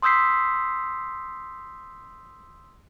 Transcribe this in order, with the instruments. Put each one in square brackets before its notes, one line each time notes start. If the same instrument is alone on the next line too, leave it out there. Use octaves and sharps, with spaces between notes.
[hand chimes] C6 D#6 E6 G6 B6 C7